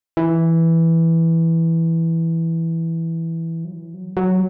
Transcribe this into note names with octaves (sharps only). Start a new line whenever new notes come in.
E3
F#3
E3
F#3
F#3